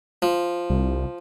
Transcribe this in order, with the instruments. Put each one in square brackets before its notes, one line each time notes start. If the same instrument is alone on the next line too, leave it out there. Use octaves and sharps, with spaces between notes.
[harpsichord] F3
[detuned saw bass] C2